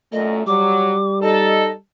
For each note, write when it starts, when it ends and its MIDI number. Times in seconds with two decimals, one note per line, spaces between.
0.12 0.41 42
0.12 0.41 46
0.12 0.46 57
0.12 0.35 75
0.47 0.94 54
0.47 1.78 55
0.47 1.21 86
1.22 1.70 63
1.22 1.70 69
1.22 1.71 75